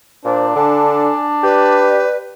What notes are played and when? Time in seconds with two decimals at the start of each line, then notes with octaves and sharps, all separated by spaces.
0.25 A#2 D4 C5
0.56 D3 G#5 A5
1.43 G4 B4 D5